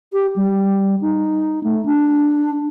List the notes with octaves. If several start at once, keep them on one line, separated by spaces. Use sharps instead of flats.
G4
G3
D#4
A3
D4